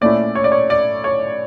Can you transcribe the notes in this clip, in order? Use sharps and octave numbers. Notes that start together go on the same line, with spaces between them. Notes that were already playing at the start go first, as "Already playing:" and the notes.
A#2 A3 C#4 E4 D5
C#5
D5
C#5
D5
C#5